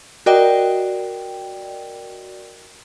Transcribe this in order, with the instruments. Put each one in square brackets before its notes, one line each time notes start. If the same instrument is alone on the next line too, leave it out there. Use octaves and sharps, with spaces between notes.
[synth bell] F#4 A#4 D5 D#5 G5